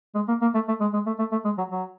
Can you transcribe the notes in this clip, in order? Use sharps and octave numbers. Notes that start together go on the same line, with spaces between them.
G#3
A#3
A#3
A3
A3
G#3
G#3
A3
A3
A3
G#3
F#3
F#3